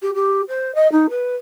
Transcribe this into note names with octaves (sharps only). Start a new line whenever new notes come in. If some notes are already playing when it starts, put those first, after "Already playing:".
G4
G4
C5
D#5
D#4
B4